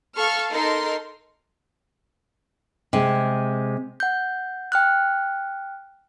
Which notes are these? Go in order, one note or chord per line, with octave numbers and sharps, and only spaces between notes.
A4 F5 C#6 F6
D#4 A4 A#4 C6
C3 G#3
F#5 G6
G5 F6 F#6